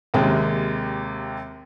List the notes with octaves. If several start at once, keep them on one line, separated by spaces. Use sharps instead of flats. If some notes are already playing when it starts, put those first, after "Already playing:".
D#2 C3 G#3